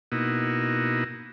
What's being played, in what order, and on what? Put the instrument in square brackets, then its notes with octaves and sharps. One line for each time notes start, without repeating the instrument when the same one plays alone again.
[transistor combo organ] B2 A#3 D#4 E4 F#4